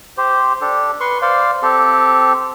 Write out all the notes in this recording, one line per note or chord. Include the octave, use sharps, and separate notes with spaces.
G4 C5
D4 G4 A4
B4 C6 C#6
C5 D5 F5
C4 G4 A4